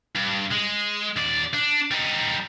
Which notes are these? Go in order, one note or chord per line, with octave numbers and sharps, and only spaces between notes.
G2
G#3
D#2 D5
D4
G3 D#4